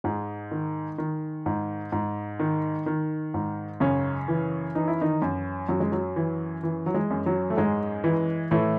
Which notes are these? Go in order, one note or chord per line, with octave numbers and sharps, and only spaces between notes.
G#2 G#3
D#3
D#3
G#2
G#2
D#3
D#3
G#2
F#2 C#3 C#4
E3
E3 D#4
E4
D#3 D#4
F#2
F#2 F#3
G#3
F#3
E3
E3
F#3
G#3
F#2
F#3
A3
G#2 G#3
E3
A2 E3 A3